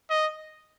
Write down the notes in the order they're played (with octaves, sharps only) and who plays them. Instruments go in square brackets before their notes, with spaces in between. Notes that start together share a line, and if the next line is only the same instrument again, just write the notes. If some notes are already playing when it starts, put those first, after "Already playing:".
[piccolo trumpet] D#5